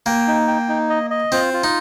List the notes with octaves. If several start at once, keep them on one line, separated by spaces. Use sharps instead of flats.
A#3 G5
D#4
G5
D#4
D#5
D#5
C4 F4
F4
D#4